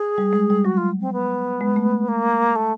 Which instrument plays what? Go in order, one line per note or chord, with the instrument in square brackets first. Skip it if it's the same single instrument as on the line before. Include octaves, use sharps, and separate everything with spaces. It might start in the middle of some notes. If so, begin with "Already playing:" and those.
Already playing: [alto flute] G#4
[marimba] G3
G#3
G3
[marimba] F#3 [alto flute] F#4
[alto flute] F4
C4
B3
[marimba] G#3
A3
[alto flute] A#3
A3